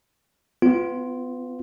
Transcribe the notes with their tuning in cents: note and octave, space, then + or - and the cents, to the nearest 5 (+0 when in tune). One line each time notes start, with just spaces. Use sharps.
B3 +30 F4 +0